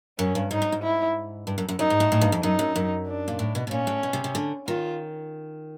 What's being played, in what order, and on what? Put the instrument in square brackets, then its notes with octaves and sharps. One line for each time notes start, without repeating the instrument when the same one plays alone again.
[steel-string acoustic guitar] F#2 [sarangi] C#4
[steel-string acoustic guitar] G2
[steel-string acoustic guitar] G#2 [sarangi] D#4
[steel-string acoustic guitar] G#2
G#2
[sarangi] E4
[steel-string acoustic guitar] G2
F#2
F#2
[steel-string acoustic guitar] F#2 [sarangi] D#4
[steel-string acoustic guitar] G#2
A2
A2
G2
F2
[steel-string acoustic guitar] F#2 [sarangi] D#4
[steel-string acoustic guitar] F#2
F#2
[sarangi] D4
[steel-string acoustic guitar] A#2
A2
B2
B2
[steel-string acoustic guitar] A#2 [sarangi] C#4
[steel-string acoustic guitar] A2
B2
C3
C3
D3
[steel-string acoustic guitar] D#3 [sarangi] F4